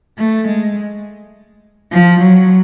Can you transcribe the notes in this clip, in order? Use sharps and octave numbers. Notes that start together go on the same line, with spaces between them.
A3
G#3
F3
F#3